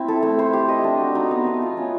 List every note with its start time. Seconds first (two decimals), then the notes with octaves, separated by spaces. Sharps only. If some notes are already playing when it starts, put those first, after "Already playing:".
Already playing: C4 E4
0.08 A4
0.23 A3
0.39 C5
0.53 G4
0.69 D#5
0.84 D4
0.99 F#4
1.15 D#4
1.31 B3
1.46 B3
1.62 F4
1.77 C#4